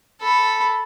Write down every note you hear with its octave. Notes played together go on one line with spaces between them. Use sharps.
A4 B5